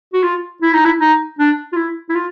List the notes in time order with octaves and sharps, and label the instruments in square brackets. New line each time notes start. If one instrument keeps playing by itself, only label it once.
[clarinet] F#4
F4
E4
D#4
E4
D#4
D4
F4
E4
E4
F4